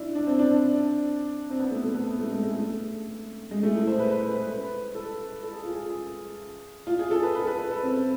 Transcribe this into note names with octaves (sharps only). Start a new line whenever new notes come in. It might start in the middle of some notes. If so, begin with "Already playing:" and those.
Already playing: D4 E4
D4
C4
D4
C4
B3
A3
A3
B3
B3
A3
G#3
A3
A3
G#3
A3
E4
C5
B4
B4
C5
B4
B4
A4
A4
G#4
F4
G#4
F4
G#4
A4
B4
B4
A4
B4
B4
A4
C4